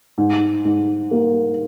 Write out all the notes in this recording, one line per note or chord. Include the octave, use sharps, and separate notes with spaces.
G#2
G#2
A#3